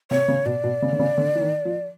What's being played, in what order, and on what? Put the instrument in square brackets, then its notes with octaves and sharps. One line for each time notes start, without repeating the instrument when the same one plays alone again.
[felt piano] C3 [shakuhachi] C#5
[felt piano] C#3
[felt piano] B2 [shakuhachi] D5
[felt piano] B2
C#3
D3
C#3
D3
E3
D#3
F3